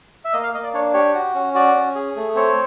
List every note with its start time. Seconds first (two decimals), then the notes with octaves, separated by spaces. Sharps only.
0.25 E5
0.33 A#3 D#5
0.43 F5
0.54 A#3 D#5
0.63 D5
0.74 D4 C#5
0.94 G4 C#5
1.15 F#4
1.34 C#4
1.54 F#4 D5
1.75 C#4
1.95 G#4
2.16 A3
2.35 C4 C#5